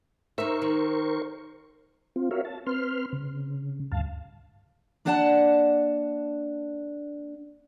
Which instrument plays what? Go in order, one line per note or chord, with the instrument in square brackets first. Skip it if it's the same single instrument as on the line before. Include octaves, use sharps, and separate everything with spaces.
[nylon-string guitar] D#4 E5 [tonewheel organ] A#4 C5 C#6
[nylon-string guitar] D#3
[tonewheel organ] C4 F4
F#4 A#4 C#5 E5 F5
A5
C4 B4 C6 F6
C#3
D2 G2 F5 A5
[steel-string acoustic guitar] A#3 D4 D5 F#5 G5 A5